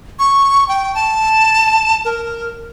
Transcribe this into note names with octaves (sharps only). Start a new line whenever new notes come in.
C#6
G5
A5
A#4